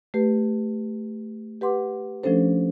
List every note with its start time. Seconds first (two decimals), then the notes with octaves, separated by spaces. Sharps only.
0.14 A3 G4 B4
1.61 G4 B4 F#5 C6 D6
2.23 F3 A3 C#4 D4 A4 C5